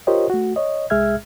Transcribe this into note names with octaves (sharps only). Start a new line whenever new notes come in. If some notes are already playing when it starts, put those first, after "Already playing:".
F4 G4 A#4 C5 C#5 D#5
A3 F#4
C#5 D#5
C2 G#3 G#4 E5 F6 G#6